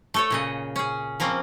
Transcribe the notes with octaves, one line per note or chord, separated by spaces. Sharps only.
A3 A4 C#5
A#2 C#3 D#5
C#4 G#4
F3 A#3 C4 C#4